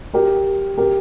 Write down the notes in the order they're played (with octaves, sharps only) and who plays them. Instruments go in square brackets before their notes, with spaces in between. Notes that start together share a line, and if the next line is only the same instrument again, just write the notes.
[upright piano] G4 A#4
G4 A#4